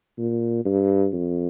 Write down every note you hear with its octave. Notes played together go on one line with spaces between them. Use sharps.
A#2
G2
F2